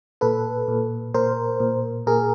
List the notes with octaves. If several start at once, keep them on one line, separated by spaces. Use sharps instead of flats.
A#2 A4 B4
A#2
A#2 A#4 C5
A#2
A#2 G#4 A#4